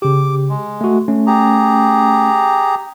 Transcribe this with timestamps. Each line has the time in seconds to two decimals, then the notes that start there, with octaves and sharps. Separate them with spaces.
0.02 C#3 G4 D6
0.49 G#3
0.81 A3 F#4
1.08 A3 C#4
1.27 G4 G#4 A#5